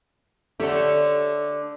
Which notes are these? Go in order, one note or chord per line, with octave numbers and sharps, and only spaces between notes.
D3 A3 G4 A4 C#5